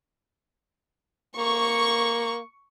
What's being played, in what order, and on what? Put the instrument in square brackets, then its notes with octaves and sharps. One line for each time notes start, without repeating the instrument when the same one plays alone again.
[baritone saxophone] A#3 [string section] C#6